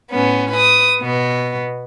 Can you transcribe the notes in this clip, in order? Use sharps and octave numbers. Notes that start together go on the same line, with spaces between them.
A2 B3 C#4
B4 D#6
B2 B3